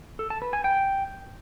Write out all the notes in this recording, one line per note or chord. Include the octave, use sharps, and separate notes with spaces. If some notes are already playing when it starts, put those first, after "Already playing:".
A4
A5
B4
G#5
G5